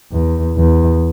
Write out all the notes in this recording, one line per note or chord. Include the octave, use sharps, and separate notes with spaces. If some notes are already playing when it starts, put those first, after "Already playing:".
E2
E2